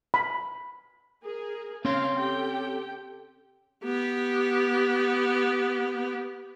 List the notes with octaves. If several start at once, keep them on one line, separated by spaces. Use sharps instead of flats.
B5
G#4 A#4
C4 C#4 C#5 F5 C6
G4 A4 G5
B3 G4